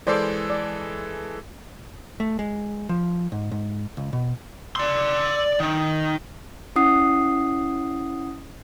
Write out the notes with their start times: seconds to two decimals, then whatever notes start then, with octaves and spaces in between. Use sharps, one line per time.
0.07 E3 G#3 A4 C5 D5 C6
0.50 D5
2.20 A3
2.39 G#3
2.89 F3
3.32 G#2
3.51 G#2
3.97 C#2
4.13 B2
4.76 D5 C6
5.60 D#3
6.76 C#4 E4 F#5 D#6 C7